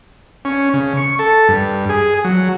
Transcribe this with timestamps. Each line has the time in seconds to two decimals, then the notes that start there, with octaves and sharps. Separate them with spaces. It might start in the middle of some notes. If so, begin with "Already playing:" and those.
0.45 C#4
0.74 C#3
0.97 C#6
1.19 A4
1.48 G2
1.89 G#4
2.24 F#3